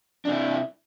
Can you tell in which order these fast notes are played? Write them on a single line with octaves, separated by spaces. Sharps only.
D4 C3 E4